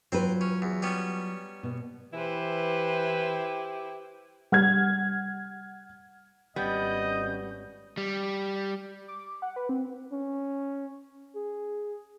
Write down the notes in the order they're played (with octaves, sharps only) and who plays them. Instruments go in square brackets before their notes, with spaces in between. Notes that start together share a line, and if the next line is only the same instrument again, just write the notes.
[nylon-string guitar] F#3 F4 B4 [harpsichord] C4 C5
[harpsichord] C#4
E2
G3 B3 C#4
[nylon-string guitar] B2
[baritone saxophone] E3 [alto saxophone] E4 [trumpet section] G4 [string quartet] B4 C5
[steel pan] G3 [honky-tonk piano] F#5 F6 G#6
[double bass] G#1 C#4 [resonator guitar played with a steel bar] G3 B3 [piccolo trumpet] D#5 [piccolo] G6
[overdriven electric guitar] G3
[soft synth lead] D6
F#5
B4
C4
[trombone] C#4
G#4